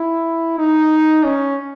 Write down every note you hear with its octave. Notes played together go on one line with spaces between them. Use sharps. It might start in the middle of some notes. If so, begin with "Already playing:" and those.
Already playing: E4
D#4
C#4